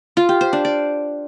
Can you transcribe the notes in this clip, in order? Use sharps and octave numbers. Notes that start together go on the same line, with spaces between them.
F4
G4
C5
D4
D5